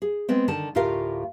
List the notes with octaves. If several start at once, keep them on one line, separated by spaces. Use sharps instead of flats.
G#4
G#3 B3 C4
D3 D#3 A5
D2 A2 F4 G4 A#4 F5